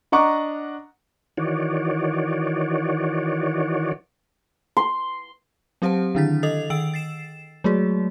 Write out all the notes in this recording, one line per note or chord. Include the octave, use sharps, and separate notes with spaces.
D4 D#5 F#5 A#5 C#6 D6
D#3 E3 F#4 C#5 D5
C6
F#3 C4 G4 C5 F#5 A5
D3 D#3 D4 E4 A6 B6
A4 D#5 D#6 A6 F7
D#3 G5 E6 D7 F#7
A6 C7 E7
F#3 G#3 A3 F#4 G#4